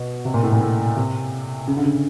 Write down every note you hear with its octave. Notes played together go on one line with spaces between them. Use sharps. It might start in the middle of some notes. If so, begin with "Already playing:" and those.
Already playing: B2
C3
A#2
A2
A#2
A2
C3
C#3
D3
C#3